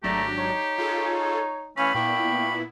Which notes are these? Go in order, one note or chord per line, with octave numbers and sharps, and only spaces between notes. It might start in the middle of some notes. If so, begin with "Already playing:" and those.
G#1 F#3 A3 D4 G4 A#5
D#4 C#5
F4 G#4 A4
E3 A3 C#4 F5 B5
A#2 B3 D4 E4 F5 G5 C#6